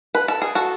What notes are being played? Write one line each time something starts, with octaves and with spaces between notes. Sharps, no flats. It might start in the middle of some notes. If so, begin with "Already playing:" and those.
B4
A4
G#4
F#4 A4